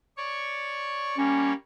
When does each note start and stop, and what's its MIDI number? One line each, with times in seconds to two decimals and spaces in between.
0.17 1.17 73
0.17 1.17 74
0.17 1.17 85
1.18 1.53 55
1.18 1.53 58
1.18 1.53 61
1.18 1.53 73